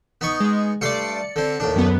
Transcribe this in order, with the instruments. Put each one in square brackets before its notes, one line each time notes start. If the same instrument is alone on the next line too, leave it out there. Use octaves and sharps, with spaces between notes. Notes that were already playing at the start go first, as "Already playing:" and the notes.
[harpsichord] B3 D#4 C#6
[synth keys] G#3
[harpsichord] G2 A3 C6 [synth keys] D5 C#7
[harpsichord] D3 C4
D#2 A2 D4
[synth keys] F#2 B3